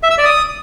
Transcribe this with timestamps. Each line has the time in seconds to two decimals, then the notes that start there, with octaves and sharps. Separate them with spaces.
0.03 E5
0.11 E6
0.18 D5
0.25 D#6